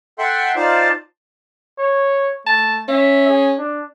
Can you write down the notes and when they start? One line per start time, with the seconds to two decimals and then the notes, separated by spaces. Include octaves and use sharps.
0.19 A4 E5 F#5 G5 C6
0.56 D#4 F4 C5 D5 A5
1.78 C#5
2.47 A3 A5
2.88 C#4 E5
3.28 G#4
3.58 D4